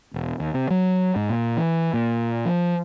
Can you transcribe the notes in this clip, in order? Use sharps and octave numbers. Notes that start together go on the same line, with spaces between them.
E1
D#2
C3
F#3
G#2
A#2
E3
A#2
F3